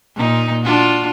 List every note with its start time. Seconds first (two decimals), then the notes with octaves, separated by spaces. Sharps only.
0.16 A#2 D#4
0.63 D4 F4 F#4